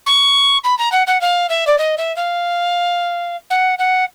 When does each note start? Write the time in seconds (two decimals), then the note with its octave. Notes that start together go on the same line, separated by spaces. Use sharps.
0.06 C#6
0.64 B5
0.78 A#5
0.92 F#5
1.07 F#5
1.21 F5
1.49 E5
1.67 D5
1.78 D#5
1.97 E5
2.16 F5
3.50 F#5
3.78 F#5